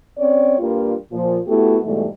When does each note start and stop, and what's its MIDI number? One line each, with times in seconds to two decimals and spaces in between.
0.19 0.57 60
0.19 0.57 61
0.19 0.57 73
0.19 0.57 74
0.59 0.93 43
0.59 0.93 55
0.59 0.93 58
0.59 0.93 65
1.12 1.38 46
1.12 1.38 53
1.47 1.78 57
1.47 1.78 59
1.47 1.78 64
1.47 1.78 66
1.47 1.78 67
1.47 1.78 69
1.83 2.06 44
1.83 2.06 47
1.83 2.06 52
1.83 2.06 55
1.83 2.06 57